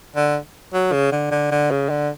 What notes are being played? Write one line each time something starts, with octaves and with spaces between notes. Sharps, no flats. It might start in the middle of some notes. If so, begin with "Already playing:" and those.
D3
F#3
C#3
D3
D3
D3
C#3
D3